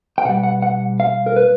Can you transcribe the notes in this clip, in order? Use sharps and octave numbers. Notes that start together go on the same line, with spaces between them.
G5
B2 G3 F#5
F#5
F#5
F5
A#4
B4